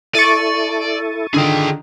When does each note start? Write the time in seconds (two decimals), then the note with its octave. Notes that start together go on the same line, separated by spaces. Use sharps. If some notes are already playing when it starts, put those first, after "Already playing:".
0.15 E4 A4 D5 C#6 A6 D#7
1.34 D3 D#3 F4 G#4 G5